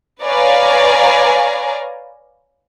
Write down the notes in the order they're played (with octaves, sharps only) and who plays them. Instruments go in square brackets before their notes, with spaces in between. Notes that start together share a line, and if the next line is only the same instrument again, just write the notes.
[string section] B4 C#5 D5 F5 G#5 A#5